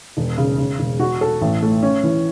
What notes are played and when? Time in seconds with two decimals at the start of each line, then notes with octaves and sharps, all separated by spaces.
0.17 E1
0.38 C#3
0.58 C#3
0.79 E1
1.00 F#4
1.21 A4
1.41 A1
1.63 A3
1.83 C#4
2.03 E3